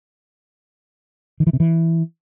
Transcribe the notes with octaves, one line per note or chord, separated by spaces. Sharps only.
D#3
E3
C3
E3